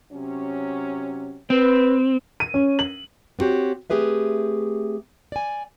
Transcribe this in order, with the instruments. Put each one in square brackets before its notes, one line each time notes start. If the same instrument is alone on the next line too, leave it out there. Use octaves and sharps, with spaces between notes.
[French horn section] C3 F#3 C#4
[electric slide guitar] C4 [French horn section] B4
[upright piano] D#7
C#4
F#7
[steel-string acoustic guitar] B3 C4 F#4 G4 C#5
A3 C4 G4 G#4 B4 E5
D5 G#5